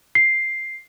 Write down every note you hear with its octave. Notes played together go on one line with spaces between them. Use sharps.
C7